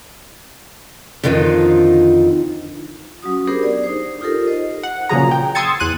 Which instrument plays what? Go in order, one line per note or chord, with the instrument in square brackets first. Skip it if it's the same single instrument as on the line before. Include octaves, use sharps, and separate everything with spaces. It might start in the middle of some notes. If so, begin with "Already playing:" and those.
[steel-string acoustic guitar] F2 D3 D#3 F3 D#4 F4
[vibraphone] F#3 C#4 F#4 D#6
B3 D4 G4 G#4 A#4 C5
D5
D#4 C5
D#4 F4 G4 A4 A#4
C5 D#5
[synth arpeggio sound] F#5
A#2 C#3 F3 F#3 G#4 A#5
G5
C6 D#6 E6 G#6 A6 C#7
E2 F#6 D#7